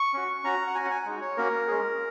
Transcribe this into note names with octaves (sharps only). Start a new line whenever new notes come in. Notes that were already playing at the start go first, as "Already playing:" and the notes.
Already playing: C#6
C#4 F#4
C#4 F#4 A#5
F#5
C#4 F#4 G#5
F#5
G#5
G#3 D#4 F#4
C#5
A#3 C#4 F#4 A#4
G#3 C#4 G#4